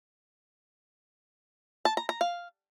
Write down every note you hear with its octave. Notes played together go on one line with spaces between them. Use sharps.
A5
A#5
A#5
F5